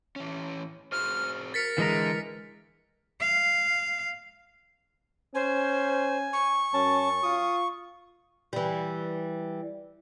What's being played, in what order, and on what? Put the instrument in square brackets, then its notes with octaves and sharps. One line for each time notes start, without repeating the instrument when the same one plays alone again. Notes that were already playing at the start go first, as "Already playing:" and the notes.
[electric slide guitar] E3 C#4
[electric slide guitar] F#4 G#4 C5 [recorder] F6
[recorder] A#4 [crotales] A6 B6 C#7
[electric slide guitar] D3 [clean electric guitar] E3 G#3 A#5
[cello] F5
[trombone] C#4 [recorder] C5 [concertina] G#5
[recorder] C#6
[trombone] F#2 [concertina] C#4 A5
[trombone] F4 [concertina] D#6
[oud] E3 G3